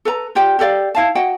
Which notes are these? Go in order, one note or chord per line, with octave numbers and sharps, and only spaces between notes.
A4 B4 A#5
F4 G4 D5 G5
G4 A4 D5 F5
E4 F5 A5
F#4 D#5 F#5 G5